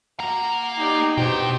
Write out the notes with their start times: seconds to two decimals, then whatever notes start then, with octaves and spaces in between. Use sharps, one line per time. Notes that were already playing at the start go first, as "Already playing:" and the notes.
0.20 A#3 F#4 A#5
0.78 D#4 G4 D5
1.17 B2 B3 D4 D#4 F#4 G4 C5 G5